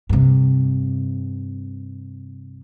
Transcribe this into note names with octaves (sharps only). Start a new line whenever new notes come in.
G2 C3